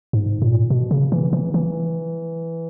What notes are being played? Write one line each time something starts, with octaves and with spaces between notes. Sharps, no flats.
G#2
A#2
B2
C#3
E3
E3
E3